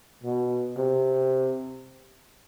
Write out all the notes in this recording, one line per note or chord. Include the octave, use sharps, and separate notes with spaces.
B2
C3